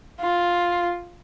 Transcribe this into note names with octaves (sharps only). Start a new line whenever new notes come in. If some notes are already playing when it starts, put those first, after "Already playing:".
F4